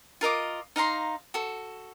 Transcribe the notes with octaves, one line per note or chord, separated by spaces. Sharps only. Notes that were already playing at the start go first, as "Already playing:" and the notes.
F4 A#4 D#5 D6
D#4 F5 A#5 C6
F#4 A4